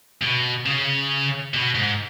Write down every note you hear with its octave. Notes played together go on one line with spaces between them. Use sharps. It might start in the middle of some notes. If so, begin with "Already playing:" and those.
B2
C#3
B2
G#2